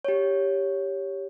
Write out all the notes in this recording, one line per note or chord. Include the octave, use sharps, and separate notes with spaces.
G4 C#5